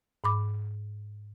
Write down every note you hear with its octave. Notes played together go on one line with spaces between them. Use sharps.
G#2 B5 D6